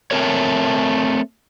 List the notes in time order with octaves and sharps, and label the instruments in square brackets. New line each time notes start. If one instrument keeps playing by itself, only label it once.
[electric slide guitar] A3 C4 A#4 C#5